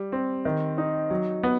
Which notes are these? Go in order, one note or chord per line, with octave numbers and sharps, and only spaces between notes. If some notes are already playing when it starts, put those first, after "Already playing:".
Already playing: G3
C4
D#3
D#4
F#3
B3